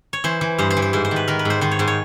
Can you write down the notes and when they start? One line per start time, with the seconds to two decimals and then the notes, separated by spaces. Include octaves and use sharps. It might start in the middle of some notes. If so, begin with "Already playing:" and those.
0.13 C#5
0.24 E3 C5
0.41 E3
0.58 G2 C5
0.70 C5
0.77 E3
0.82 C5
0.93 G#2 C5
1.05 C5
1.11 D#3
1.16 B4
1.28 D#3 A#4
1.39 B4
1.45 G#2 C5
1.61 D#3 C5
1.71 C#5
1.79 G#2 C5
1.88 C#5